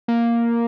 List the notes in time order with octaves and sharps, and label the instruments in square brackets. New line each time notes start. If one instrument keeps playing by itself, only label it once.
[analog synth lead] A#3